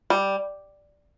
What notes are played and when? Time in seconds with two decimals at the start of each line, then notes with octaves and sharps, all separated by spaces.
0.10 G3